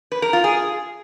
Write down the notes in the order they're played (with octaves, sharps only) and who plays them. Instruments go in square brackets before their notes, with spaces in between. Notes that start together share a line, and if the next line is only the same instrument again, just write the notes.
[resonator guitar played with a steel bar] B4
A#4
F4
G#4